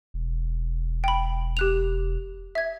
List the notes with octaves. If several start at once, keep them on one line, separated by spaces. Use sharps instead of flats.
E1
G5 B5
G4 F#6 F7
E5 G#6